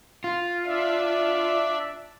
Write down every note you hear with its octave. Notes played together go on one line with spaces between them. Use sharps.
F4
D4 D5 E5